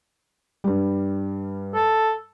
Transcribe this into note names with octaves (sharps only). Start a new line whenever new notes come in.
G2 G3
A4